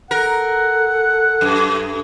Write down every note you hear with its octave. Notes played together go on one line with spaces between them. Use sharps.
A4 A#4 F#5
F#2